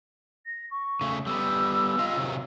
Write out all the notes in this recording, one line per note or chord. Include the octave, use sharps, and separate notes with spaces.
A#6
C#6
C#3 A3
G3 B3 E6
F4 D#5 F5
C3 D#3 F#3